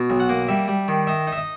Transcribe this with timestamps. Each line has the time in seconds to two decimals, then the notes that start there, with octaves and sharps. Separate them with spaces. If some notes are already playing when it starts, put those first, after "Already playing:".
Already playing: B2
0.10 B1
0.20 F#5
0.29 A#3
0.48 G3 E5
0.68 G3
0.88 D#3
1.07 D#4 E5
1.27 D#4
1.32 E5
1.37 D#5